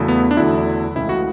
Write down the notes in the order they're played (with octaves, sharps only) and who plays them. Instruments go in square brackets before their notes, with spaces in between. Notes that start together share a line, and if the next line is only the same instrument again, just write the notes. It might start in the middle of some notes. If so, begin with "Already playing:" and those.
Already playing: [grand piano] E2 C#3 F#3 A3 E4
[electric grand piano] B3
D4
[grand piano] E2 D3 F#3 A3 [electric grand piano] E4
[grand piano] C#2 C#3 E3 A3 [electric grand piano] E4
[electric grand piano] F#4